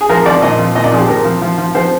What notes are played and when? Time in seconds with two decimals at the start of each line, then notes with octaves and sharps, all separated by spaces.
0.01 G#4
0.09 F3 A#4
0.26 F3 D5
0.42 A#2 D#5
0.59 F3
0.75 A#2 D#5
0.84 D5
0.92 F3 G#4
1.00 G4
1.08 A#2 A#4
1.25 F3
1.42 F3
1.58 F3
1.75 F3 C5